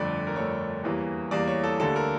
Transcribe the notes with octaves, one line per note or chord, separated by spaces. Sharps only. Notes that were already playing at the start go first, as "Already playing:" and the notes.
Already playing: G1 F2 D3 A3 D5
A#4
G1 F2 D3 A3 C#5
E2 E3 G3 A#3
E2 E3 G3 A#3 D5
C#5
A4
D2 D3 G3 A#3 A4
A#4